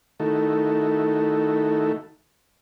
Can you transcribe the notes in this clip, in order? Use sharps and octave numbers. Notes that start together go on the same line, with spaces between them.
D#3 A3 D#4 E4 F#4 A4